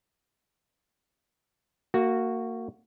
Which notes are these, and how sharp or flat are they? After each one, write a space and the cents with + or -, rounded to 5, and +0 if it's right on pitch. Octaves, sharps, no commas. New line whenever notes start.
A#3 -25 F#4 +0